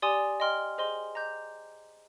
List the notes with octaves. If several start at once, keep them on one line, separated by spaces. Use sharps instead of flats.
G4 D5 G#5 C6 D#6
D#5 G5 C6 F6
G#4 C5 D#5 G#5 C6
D#5 A#5 D6 G6